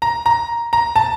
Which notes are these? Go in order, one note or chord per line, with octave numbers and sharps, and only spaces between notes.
A#5
A#5
A#5
A5